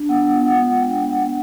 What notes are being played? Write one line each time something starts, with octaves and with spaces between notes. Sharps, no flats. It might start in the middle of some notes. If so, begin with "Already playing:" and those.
Already playing: D4
B3 F#5
F4
F#5
G#3
F#5
D4 G5
B3 F#5
F#5